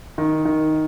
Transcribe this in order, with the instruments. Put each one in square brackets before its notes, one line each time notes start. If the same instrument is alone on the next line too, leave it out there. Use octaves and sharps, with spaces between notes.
[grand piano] D#3
D#3